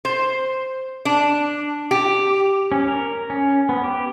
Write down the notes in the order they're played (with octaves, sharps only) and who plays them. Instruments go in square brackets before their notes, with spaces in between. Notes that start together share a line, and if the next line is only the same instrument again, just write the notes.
[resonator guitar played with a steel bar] C5
D4
G4
[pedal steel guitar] C#4
A#4
C#4
B3
G4